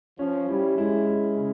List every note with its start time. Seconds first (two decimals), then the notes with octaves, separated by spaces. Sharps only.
0.18 F3 C#4
0.48 G3 E4
0.77 G#3 E4
1.07 E4
1.37 C#3